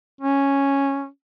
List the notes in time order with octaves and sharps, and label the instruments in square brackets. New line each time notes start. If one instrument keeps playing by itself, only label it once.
[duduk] C#4